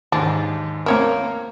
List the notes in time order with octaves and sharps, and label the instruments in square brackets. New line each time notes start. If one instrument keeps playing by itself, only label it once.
[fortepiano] D#2 G#2 [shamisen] D4
[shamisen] E3 C#5 E5 [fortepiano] A#3 C4 A#4